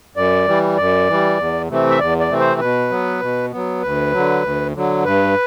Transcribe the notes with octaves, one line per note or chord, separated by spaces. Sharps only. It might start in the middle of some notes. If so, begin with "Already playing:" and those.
F#2 D5
E3 G3
F#2 D5
E3 G3
E2
C3 E3 A3 C4
E5
E2 D5
D5
C3 E3 A3 C4
C5
B2 B4
F#3 B3
B2
F#3 B3
D2 B4
D3 F#3
D2
D3 F#3
G2 B4